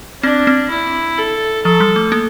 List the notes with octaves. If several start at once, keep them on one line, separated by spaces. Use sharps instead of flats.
C4 D4
C4
E4
A4
F3 A4
G3
A3
A#3